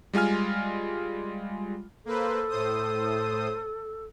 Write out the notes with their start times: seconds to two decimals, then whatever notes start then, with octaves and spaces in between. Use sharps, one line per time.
0.14 G3 G#3 F4 G#5 F6
2.06 A#3 A4 B4 C5
2.49 A2 C5 D#6